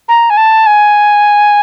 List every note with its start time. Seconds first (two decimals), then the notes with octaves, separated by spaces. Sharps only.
0.08 A#5
0.30 G#5
0.37 A5
0.66 G#5